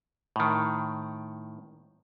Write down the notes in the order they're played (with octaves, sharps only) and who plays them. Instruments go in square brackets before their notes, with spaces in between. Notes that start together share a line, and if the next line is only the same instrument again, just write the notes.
[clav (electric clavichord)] A2 D#3